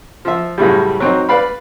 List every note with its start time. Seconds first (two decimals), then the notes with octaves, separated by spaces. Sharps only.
0.25 F3 E5
0.58 F#2 A2 C#3 G3
1.00 F#3 C4 D#4
1.29 B4 D5 F5 B5